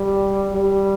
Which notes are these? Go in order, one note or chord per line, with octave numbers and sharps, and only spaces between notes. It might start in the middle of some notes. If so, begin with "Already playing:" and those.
Already playing: G3
G3